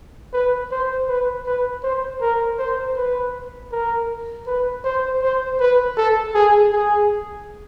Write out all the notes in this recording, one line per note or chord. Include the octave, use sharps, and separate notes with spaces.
B4
C5
B4
B4
C5
A#4
C5
B4
A#4
B4
C5
C5
B4
A4
G#4
G#4